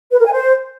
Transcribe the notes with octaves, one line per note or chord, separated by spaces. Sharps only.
B4
A#4
G#5
C5